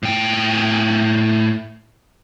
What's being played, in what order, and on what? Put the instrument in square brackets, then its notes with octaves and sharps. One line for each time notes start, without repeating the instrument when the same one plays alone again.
[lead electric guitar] A2 G5